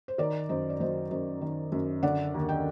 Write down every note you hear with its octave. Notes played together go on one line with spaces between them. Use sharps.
C5
D#3 A#4 D5
F#2 C5 D#5
D5
F#3 C5 D#5
F#2 C5 D#5
D#3
F#2
D3 D5 F#5
D#2
D#5 G5